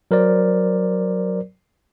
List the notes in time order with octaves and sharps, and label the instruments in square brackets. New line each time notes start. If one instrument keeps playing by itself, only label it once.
[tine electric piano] F#3 A#4 C5 D5